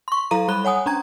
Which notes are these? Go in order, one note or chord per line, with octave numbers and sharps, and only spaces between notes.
C6 C#6
F#3 E4 A4 F5 A#5 D#7
G3 A4 B5 F#6 G7
C#5 F#5 G#5 D#6
C#4 D4 A#5 G#6